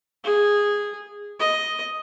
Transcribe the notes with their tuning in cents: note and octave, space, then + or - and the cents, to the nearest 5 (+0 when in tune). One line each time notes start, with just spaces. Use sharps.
G#4 -10
D#5 +5